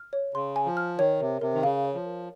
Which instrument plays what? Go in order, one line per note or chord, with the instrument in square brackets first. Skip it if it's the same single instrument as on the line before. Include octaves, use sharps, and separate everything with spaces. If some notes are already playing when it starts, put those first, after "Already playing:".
Already playing: [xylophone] F6
C#5
[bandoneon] C#3 [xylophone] C6
[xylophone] G#5
[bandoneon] F3
[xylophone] F6
[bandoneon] D#3 [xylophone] C#5
[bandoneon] C3 [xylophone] A#4
[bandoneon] C3 [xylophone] A#4
[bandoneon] D#3
[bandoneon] C#3 [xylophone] F5
[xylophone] C#5
[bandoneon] F3
[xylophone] A#4